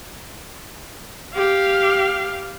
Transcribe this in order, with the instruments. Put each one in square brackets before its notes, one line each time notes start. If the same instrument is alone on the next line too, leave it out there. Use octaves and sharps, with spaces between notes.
[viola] G4 F5